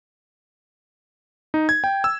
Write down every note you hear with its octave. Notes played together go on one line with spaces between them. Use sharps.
D#4
G#6
G5
E6